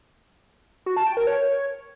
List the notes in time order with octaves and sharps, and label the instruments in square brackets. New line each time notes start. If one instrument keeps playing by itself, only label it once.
[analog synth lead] F#4
A5
G5
A#4
C#5